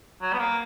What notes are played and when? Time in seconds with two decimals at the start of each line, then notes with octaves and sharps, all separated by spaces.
0.22 F#3
0.33 B3
0.39 A#3